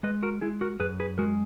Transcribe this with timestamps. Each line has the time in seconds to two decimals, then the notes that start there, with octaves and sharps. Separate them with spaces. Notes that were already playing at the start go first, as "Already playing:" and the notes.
0.03 G#3 B4 D#5
0.23 F#4 A#4
0.41 G#3 E4 G#4
0.61 F#4 A#4
0.80 F#2 G#4 B4
1.00 G#4 B4
1.18 G#3 F#4 A#4